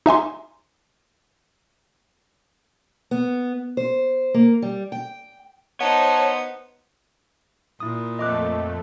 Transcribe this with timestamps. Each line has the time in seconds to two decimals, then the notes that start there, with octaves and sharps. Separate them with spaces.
0.06 D#4 E5 G#5 C6
3.11 B3
3.77 C5
4.34 A#3
4.62 G3
4.92 G5
5.81 B3 D#4 C5 C#5 A5
7.80 A#2 E4 D#6
8.19 F2 A3 D#5 D6 F#6